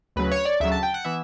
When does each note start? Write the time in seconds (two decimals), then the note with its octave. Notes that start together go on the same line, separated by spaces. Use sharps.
0.16 D2 C#3 F#3 B4
0.32 C#5
0.45 D5
0.60 D2 C#3 F#3 E5
0.72 A5
0.83 G5
0.94 F#5
1.05 E3 B3 E5